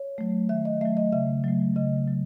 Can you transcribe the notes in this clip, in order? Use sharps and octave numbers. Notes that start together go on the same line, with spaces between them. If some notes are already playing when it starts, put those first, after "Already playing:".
Already playing: C#5
F#3 A3
D#3 E5
D#5
F#3 A3 E5
D#5
C#3 E5
F#3 A3
C#3 D#5
F#3